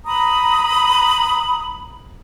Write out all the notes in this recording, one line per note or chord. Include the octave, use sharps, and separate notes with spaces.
A#5 B5 D#6